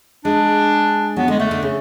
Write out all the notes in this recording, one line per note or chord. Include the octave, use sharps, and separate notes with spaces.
G#3 D4
F#3 B3
D3 G#3
D3 A3
D3
C#3